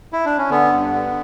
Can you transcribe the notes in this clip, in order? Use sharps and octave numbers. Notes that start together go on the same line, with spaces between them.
E4
D4
C#4
D3 B3
G2
D3